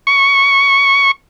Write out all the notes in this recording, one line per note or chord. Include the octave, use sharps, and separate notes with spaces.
C#6